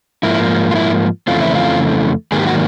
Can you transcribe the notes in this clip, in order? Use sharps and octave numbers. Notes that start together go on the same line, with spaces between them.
G#2 F3 A#3 E4
F4
E4
F2 C#3 E3 A3 C4 F4
E4
F4
G#2 D#3 F#3 A#3 G#4
G4
F#4